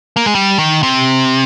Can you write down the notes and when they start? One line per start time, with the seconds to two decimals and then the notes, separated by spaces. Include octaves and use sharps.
0.16 A#3
0.26 G#3
0.35 G3
0.58 D#3
0.83 C3